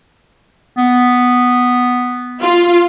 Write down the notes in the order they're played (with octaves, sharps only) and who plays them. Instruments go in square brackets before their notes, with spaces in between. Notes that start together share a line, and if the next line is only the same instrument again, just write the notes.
[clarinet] B3
[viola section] F4